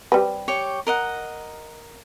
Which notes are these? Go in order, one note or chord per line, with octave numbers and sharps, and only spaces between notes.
G3 C4 B4
G4 C#5 C#6
A#4 D#5 F#5